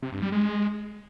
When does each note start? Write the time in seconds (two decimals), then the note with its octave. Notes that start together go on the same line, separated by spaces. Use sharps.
0.03 C3
0.12 G2
0.22 G3
0.32 G#3